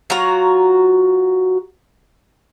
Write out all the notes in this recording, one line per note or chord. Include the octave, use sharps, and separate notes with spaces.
F#3 F4 F#4 A#5